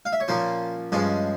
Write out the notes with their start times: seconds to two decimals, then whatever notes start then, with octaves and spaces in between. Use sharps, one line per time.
0.05 F5
0.13 E5
0.20 C#5
0.28 A#2 F3 A#3 C#4 C5
0.92 G2 F3 G#3 C#4 C5